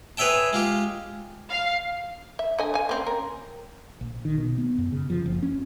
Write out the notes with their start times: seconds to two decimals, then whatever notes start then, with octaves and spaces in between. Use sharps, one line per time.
0.17 G#4 B4 C#5 E5 G5 A5
0.53 G#3 F4 G4
1.50 F5
2.39 E5
2.59 D3 D#5 G#5
2.74 F5 G#5
2.89 A#3 C4 C#4
3.07 A#4
4.01 A#1
4.25 D#3
4.38 B2
4.58 B3
4.78 F#2
4.92 C#3
5.10 F3
5.26 F#1
5.42 C#4